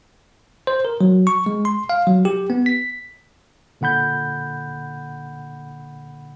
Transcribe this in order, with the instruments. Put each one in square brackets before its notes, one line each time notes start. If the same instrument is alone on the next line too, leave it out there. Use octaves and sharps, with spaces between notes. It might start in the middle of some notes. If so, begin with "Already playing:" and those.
[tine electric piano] C5
A#4
F#3
C#6
G#3
C6
F5
F#3
G4
B3
B6
A#2 D3 F#5 B5 G6